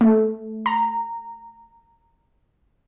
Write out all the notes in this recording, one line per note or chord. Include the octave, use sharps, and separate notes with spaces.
A3
A#5